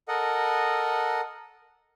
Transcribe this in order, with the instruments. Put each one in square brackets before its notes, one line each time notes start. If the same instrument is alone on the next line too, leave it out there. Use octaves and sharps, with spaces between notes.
[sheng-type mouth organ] A4 A#4 D#5 F#5